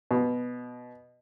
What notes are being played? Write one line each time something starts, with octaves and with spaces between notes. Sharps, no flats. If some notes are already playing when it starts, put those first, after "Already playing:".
B2